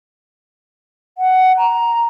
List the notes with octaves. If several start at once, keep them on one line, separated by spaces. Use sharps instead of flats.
F#5
A#5